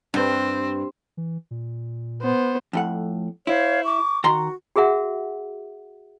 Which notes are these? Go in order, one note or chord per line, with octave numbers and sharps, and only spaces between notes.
G2 C4 D4 B4
E3
A#2
B3 C5
F2 A2 F#5
E4 C5 C#5 F5
C#6 D6
D#3 F#4 A#5 C6
F#4 G#4 A#4 E5 F#5